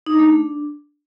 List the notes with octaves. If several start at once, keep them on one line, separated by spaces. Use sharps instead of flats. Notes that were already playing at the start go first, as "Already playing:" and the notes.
D#4
D4
A3
D4